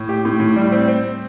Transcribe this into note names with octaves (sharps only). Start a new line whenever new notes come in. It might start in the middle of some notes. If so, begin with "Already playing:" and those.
Already playing: A2
G4
A2
A2
G3
C4
C4